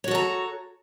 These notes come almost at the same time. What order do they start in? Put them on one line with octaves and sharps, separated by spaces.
C#5 F#4 A4 A#5